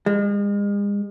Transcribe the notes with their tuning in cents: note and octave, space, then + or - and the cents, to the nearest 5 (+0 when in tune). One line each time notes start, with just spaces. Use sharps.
G#3 -40